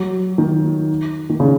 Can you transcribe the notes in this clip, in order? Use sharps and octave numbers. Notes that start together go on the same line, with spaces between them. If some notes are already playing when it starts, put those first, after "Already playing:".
Already playing: F#3
D#3
D#3
C#3